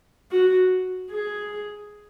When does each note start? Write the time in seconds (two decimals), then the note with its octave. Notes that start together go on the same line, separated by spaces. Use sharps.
0.31 F#4
1.10 G#4